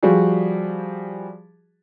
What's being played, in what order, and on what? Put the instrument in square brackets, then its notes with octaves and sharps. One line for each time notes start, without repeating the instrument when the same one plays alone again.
[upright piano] F3 G3 F#4 G#4